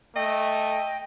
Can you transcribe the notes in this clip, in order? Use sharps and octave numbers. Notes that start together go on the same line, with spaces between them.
A3 D#5 G5